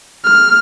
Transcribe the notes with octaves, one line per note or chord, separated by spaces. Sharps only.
F6